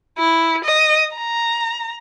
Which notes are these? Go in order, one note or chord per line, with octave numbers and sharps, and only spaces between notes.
E4
D#5
A#5